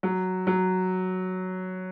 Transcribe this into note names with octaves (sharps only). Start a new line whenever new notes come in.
F#3
F#3